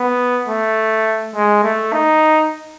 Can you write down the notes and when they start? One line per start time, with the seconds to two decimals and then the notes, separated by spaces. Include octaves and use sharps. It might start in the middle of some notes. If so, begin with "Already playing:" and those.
Already playing: B3
0.48 A3
1.35 G#3
1.64 A3
1.93 D#4